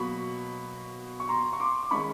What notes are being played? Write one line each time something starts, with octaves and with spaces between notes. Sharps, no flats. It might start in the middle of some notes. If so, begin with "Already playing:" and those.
Already playing: B2 F#3 A#3 B5 C#6
C#6
A#5 C6
C#6
C6 D6
D6
D#3 G#3 C#4 B5 C#6